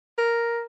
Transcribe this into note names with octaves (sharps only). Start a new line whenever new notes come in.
A#4